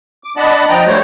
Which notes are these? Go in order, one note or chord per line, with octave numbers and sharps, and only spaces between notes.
D6
D4 D5 D#5 F#5 A5 B5
F3 D#5 G5 A#5
G3 A3 F#4 C5 C#5